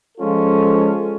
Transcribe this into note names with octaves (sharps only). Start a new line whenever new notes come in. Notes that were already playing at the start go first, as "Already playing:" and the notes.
F3 G#3 C#4 F4 A4